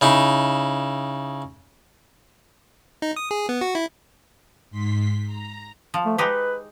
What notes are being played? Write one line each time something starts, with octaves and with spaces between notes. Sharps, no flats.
C#3 D#4 E4
D#4
D#6
G#4
B3
F#4
E4
G#2 C6 B6
A#5
F3
A3
G#3 D#4 G4 B4